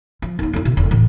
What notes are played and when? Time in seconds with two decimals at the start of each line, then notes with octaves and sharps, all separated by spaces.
0.22 F3
0.39 D#2 A#3
0.53 F2 E4
0.65 B2
0.77 E1
0.91 A2 E3